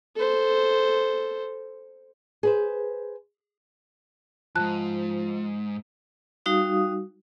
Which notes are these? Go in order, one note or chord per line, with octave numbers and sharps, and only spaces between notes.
A4 C5
G#4 B4 C5
E2 G#2 F3 A5 F#6
G3 D#4 F#4 F5 D#6